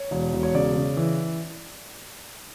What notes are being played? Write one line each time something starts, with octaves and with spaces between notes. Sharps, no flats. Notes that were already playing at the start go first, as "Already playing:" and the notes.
Already playing: C#5
E1
E1
C#5
C#3 D5
C#3
E3